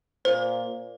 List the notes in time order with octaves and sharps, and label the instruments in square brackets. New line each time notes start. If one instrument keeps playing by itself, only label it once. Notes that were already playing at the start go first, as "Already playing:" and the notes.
[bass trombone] A#2 [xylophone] C5